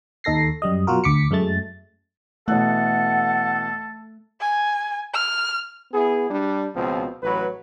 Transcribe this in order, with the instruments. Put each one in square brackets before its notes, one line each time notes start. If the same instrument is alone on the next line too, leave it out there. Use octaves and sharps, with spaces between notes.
[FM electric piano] D#2 D#4 A4 A#6 C7
F#2 G3 D#5
B2 F#3 F4 F#4 A#4
D2 D6 B6 C#7
F#2 G#3 A3 A6
[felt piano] B2 E3 F#6 [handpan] A3 [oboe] A4 [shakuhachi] F#5
[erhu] G#5
F6
[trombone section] B3 E4 G#4
G3 D4
C#2 B2 F3 C4
A1 F#3 B4